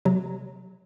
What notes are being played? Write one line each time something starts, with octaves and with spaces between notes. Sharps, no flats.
C3 F#3 A#5